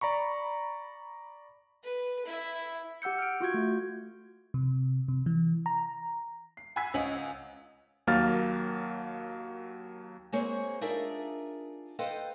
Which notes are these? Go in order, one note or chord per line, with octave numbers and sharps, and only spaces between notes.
D5 A#5 B5 C#6
B4
E4 E5
G4 F#5 E6 G6 C#7
F6 D7
F4 F#4 G6 G#6
A3
C3
C3
E3
A#5
C7
F#5 G#5 B5 E6 G#6 B6
C#2 C#5 D#5 F#5 G#5 F#7
D#2 F#3 A#3 F5 F6 A6
G#3 A#3 C4 G#4 C5 C#5
D4 D#4 F4 G#4 A#4 E5
A4 B4 C5 D#5 F5 G5